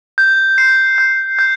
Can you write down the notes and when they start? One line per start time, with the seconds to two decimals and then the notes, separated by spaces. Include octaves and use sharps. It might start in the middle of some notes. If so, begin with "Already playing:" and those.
0.18 G6
0.58 C7
0.98 G6
1.39 G6